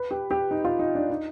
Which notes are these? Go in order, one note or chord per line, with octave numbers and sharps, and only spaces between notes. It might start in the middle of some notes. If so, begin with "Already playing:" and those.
Already playing: B4
G4
G4
D#4
F4
D#4
D4
D#4